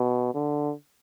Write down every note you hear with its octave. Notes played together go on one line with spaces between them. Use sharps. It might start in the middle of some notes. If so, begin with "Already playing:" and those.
Already playing: B2
D3